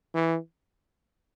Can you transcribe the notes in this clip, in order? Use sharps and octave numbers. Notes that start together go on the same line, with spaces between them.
E3